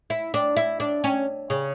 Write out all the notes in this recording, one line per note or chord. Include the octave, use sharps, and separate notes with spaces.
E4
D4
E4
D4
C#4
C#3